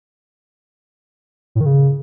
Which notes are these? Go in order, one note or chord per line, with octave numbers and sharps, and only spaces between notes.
A2
D#3
C#3